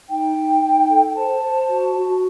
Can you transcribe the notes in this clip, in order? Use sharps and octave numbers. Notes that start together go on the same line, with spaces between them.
D#4 G5
D#4
D#4
A4
G5
C5 A5
C5
F#4
F#4